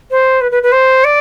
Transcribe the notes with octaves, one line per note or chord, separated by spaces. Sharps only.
C5
B4
B4
B4
C5
D5